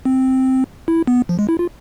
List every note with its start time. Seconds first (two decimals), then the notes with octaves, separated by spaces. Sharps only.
0.05 C4
0.88 E4
1.07 B3
1.29 F3
1.39 G#3
1.49 E4
1.59 F4